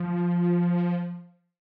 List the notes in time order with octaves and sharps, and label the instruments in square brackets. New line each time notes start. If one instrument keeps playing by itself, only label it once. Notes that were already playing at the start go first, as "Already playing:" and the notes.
Already playing: [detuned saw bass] F3